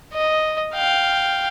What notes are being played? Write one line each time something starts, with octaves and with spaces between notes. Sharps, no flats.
D#5
F5 G5